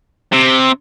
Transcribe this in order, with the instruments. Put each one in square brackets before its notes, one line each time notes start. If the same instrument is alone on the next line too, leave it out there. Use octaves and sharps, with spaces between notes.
[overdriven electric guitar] C3